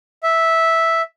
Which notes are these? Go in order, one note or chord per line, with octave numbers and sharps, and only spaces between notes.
E5